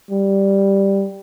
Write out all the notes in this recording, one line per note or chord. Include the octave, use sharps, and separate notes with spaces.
G3